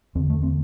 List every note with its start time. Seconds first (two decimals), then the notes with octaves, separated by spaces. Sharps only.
0.15 E2 C4
0.20 D3
0.30 A3
0.43 C4